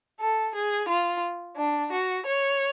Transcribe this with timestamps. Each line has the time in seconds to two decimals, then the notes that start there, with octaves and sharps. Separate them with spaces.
0.19 A4
0.54 G#4
0.88 F4
1.56 D4
1.91 F#4
2.24 C#5